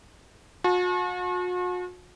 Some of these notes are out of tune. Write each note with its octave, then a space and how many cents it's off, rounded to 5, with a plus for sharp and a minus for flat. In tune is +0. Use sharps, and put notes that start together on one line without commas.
F#4 -45 A5 -30